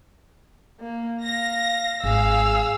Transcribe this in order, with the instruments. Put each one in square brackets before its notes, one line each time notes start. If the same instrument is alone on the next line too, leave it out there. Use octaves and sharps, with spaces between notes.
[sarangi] A#3
[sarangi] F5 [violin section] A#6
[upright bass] G#1 [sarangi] G#4 [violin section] F5 [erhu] E6